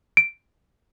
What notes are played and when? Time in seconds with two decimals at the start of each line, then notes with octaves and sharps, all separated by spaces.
0.17 D7